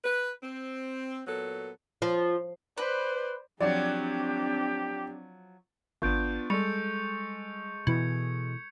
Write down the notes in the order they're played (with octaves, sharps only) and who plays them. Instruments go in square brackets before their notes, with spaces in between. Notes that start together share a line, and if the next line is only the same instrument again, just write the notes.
[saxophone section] B4
C4
A#2 F#3 B3 A4
[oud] F3
[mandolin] B4 [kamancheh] C5 D5
[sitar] F3 F#3 [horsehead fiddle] C4 D4 [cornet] G4 [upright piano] D5
[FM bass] G#1 [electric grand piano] B3 D4 F4 [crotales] C#6 G6 D7
[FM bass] G3 [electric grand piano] G#3 A4 [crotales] C#6 C#7 F7
[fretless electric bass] B2 E3 [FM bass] E4 [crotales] G#6 C#7